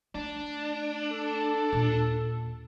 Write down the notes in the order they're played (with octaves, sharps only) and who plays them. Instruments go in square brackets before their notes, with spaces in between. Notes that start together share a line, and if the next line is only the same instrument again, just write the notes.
[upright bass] A3 [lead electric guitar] D4
[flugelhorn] A4
[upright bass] D#2 A#2